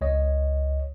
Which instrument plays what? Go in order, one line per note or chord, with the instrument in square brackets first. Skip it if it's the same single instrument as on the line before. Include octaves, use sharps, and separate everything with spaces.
[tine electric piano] C#2 C#5 D#5